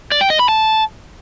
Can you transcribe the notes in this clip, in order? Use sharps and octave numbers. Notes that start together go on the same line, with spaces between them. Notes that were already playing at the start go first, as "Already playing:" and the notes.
D5
G5
D#5
B5
A5